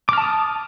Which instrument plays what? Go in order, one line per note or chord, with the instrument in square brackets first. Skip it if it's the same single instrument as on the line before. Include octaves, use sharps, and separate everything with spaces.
[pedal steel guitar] D6
F6
A5
D#6